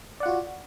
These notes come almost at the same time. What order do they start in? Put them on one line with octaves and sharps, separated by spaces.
D5 F#5 F4 F#4